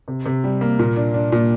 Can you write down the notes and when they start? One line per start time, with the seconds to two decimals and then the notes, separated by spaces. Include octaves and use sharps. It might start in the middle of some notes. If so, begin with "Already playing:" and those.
0.08 C3
0.26 C3
0.44 G3
0.61 A#3
0.79 A#2
0.97 D4
1.14 D4
1.32 A#2